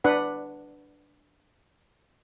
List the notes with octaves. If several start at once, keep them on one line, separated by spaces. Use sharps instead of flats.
D4 B4 F#5